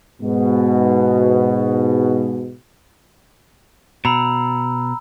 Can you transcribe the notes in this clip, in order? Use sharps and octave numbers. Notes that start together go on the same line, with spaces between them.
G#2 B2
B2 A#5 B5 E6